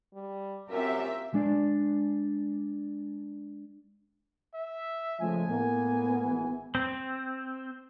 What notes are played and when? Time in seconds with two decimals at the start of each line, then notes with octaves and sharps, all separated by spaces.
0.14 G3
0.69 F#2 C4 F4 G4 A#4 E5
1.34 G#3 D4 D5
4.54 E5
5.20 C#3 F3 G#3 A3 G#5
5.49 A2 A#3 B3
6.23 G#1 E3
6.75 C4